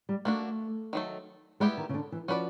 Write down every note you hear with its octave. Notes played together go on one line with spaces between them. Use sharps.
G3
A3 A#3 D4 F#4
D#3 F#3 A3
G3 G#3 B3 E4 G4
D#3
C#3
D3
E3
F3 C#4 F#4 B4 D5